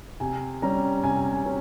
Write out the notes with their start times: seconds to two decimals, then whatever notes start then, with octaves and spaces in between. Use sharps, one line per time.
0.20 C3 G#5
0.62 G3 C#4 A#5
1.04 C3 G#5
1.32 G#5
1.46 C#4